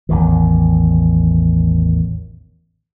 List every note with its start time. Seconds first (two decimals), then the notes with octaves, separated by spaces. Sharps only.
0.09 A1 E2 D#3